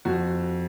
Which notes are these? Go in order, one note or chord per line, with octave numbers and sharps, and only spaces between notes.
F2 F#4